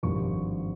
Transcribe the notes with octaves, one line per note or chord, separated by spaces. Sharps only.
G#1 G2 F3 C#6